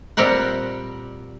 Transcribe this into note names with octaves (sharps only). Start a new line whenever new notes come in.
A#2 G3 C4 G4 A#4 F#5